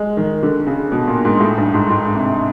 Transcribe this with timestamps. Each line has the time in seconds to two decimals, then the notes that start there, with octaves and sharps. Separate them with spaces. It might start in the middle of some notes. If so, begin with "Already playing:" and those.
Already playing: G#3
0.17 D#3
0.43 D3
0.66 C#3
0.92 B2
1.07 A#2
1.25 G#2
1.40 A2
1.57 G2
1.74 G#2
1.90 G#2
2.14 C3